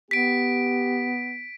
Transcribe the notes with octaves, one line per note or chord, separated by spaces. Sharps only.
B3 G4 B6 D7